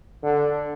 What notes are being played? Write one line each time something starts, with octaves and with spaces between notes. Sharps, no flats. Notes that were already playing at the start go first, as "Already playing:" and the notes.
D3